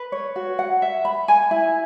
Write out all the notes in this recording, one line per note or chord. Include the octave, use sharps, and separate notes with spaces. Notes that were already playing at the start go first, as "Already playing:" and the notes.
Already playing: B4
C#5
F#4
F#5
E5
B5
G#5
E4